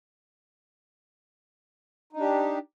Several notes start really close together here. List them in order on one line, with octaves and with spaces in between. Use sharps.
D#4 D4 G4